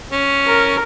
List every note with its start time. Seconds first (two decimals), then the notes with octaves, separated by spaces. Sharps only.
0.12 C#4
0.47 A#4